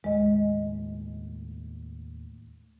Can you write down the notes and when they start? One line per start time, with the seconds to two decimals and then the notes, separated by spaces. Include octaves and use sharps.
0.04 D#2 A2 G#3 D#5